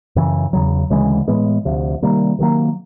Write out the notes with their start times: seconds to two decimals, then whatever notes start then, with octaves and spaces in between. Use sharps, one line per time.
0.16 F#2 C#3 E3
0.53 E2 C#3 F#3
0.90 D2 C#3 E3 G#3
1.28 A2 E3 G#3 B3
1.65 D2 C3 F3
2.03 C3 D#3 G3 A#3
2.39 C3 D#3 F#3 A#3